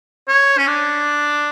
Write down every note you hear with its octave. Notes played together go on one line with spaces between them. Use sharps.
C#5
C#4
D4